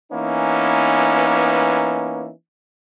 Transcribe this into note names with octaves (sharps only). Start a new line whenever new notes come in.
E3 A#3 B3 C#4 D#4